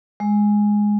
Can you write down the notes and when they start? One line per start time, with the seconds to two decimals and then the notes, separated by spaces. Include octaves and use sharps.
0.20 G#3